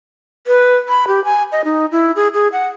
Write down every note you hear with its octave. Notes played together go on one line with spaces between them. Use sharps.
B4
B5
G4
G#5
D#5
D#4
E4
G#4
G#4
F#5